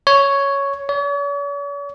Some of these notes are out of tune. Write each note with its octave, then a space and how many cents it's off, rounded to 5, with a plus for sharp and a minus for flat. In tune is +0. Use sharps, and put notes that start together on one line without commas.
C#5 +5
C#5 +45